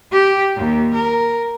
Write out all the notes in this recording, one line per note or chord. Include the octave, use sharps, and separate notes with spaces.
G4
D#2
A#4